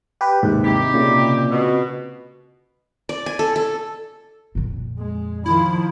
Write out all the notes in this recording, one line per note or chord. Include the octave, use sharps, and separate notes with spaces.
G4 B4
D#2 G#2 C3
D#4 E4 G4
A#2 C#3
B2
D5
G#5
A4
A4
F2 A#2
G#3
D#3 F3 E4 B5